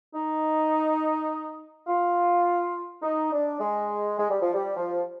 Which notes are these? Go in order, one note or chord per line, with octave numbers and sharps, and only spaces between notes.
D#4
F4
D#4
D4
G#3
G#3
G3
F3
G3
F3